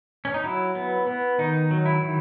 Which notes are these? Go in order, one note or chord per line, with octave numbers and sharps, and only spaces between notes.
C#4
D#4
F#3 E4
B3
B3
D#3 D#4
F#3
E4
D#3